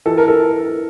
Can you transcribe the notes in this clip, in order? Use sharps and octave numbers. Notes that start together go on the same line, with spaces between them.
E3 A4
A#4
A4